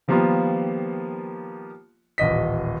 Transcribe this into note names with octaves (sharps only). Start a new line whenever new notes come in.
D#3 F3 G3 A#3 B3 F4
D#1 A1 D#5 B6